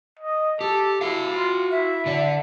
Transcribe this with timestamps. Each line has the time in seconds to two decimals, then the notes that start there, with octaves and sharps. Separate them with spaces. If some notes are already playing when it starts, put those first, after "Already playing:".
0.19 D#5
0.61 G4 A4
1.01 E4 F#4 F5
1.36 F4
1.71 E4 E5
2.06 D3 D5